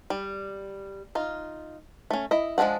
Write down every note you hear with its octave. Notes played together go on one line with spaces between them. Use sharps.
G3
D#4 F4
A3 C#4
E4 D#5
F3 G#3 A3 D4 F#5